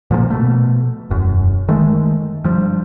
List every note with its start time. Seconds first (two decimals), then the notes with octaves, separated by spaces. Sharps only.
0.11 A#2 F3 F#3 A#3
0.30 B2 A3
1.10 E1 F#2
1.68 D#3 G#3 A3
2.44 G2 F3